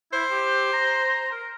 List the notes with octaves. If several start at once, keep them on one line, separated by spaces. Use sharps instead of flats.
E4 C5
G4
A#5
A#4